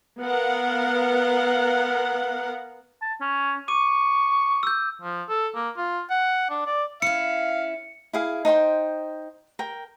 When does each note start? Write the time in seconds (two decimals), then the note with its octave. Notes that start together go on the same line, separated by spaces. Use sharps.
0.20 B3 A#4 F5 F#5
3.02 A5
3.21 C#4
3.68 C#6 D6 D#7
4.63 E6 G6
5.02 F3
5.29 A4
5.55 A#3
5.77 F4
6.10 F#5
6.50 D4
6.66 D5
7.02 C#4 E4 F5 C#7
8.13 E4 G#4 F5
8.45 D#4 C5 G5 C6
9.59 A#4 G5